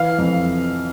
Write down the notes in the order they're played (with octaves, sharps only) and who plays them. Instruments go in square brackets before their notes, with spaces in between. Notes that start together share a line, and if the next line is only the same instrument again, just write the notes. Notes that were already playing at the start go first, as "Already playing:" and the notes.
Already playing: [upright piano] E3 F5
F2